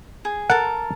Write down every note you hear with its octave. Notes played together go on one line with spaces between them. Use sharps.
G#4
A4 A#4 F#5